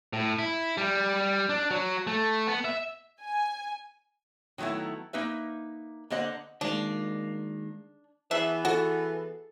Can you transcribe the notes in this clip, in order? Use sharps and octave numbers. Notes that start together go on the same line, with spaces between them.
A2
E4
G3
D4
F#3
A3
B3
E5
G#5
D#3 F#3 A3 B3 E4
A#3 D#4 B4 E5
D3 A#3 C5 D#5 F#5
D#3 G#3 A#3 D4
E3 B3 G#4 E5 A5
F#4 A4